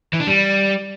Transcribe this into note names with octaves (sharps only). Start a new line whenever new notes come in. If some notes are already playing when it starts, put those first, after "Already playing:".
E3
D4
G3